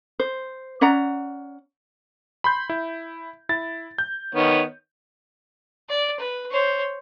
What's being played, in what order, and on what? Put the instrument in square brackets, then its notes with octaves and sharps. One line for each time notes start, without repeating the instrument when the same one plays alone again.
[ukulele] C5
C#4 D5 F#5 A#5
[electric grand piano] B5 C6 G6
E4
E4 A6
G6
[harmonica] D#3 B3 C#5
[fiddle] D5
B4
C5 C#5